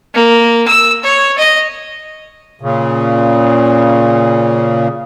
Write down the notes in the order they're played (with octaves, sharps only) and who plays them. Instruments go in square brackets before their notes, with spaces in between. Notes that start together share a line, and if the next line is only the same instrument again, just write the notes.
[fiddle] A#3
E6
C#5
D#5
[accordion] A#2 C#3